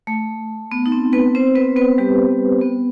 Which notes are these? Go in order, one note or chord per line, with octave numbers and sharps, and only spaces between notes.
A3
B3
D#4
C4
B3 B4
C4 C5
B3 B4
B3 B4
G3 G4
B3